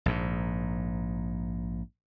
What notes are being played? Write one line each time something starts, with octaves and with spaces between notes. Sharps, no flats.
A#1 G#2